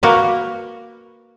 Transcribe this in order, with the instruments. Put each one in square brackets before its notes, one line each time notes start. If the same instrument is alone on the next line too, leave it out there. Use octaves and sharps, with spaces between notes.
[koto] A#3 F#4 A#4 B4